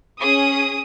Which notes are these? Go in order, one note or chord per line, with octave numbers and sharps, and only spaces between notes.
C#4 G#4 D#6